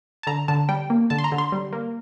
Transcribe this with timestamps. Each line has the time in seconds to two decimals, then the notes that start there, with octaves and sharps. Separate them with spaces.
0.23 A5
0.27 D3 A#5
0.48 D3 A5
0.69 G3 G5
0.90 A#3
1.10 D3 A5
1.18 C6
1.24 A#5
1.32 D3
1.38 C6
1.52 G3
1.73 A#3